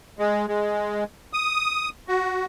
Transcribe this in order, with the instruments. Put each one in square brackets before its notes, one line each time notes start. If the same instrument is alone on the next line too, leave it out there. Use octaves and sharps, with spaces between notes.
[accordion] G#3
G#3
D#6
F#4